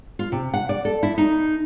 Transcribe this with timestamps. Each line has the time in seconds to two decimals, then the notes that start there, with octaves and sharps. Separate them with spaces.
0.19 F4
0.32 C3
0.54 F#5
0.69 D5
0.85 A4
1.03 E4
1.18 D#4